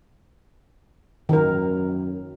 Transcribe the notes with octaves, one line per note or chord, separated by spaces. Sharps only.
F#2 D#3 A#4